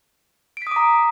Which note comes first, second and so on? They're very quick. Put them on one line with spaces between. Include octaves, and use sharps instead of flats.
D7 B6 D#6 D6 A#5